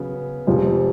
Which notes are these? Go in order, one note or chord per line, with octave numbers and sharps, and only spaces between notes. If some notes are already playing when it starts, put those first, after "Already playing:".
Already playing: C#3 F#3 B3
F1 F2 F3 G#3